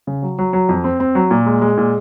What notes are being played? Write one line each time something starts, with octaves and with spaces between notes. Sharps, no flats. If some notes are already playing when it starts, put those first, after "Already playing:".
C#3
F#3
F#3
F#3
F2
C4
C4
F#3
A#2
G#3
G#3
A#2